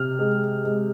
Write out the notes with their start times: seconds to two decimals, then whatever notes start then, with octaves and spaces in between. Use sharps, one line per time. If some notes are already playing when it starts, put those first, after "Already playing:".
Already playing: C3 F6
0.19 G#3
0.64 G#3